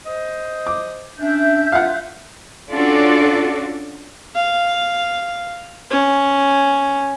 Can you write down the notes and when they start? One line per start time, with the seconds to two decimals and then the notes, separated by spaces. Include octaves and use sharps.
0.05 C5 D#5
0.67 D6
1.19 C#4 D4 E5 G6
1.72 D4 F4 F5 F#5
2.70 C#4 D4 F4 F#4 A4 D5
4.35 F5
5.91 C#4